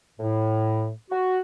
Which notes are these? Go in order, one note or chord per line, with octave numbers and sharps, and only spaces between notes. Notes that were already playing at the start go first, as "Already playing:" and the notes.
A2
F#4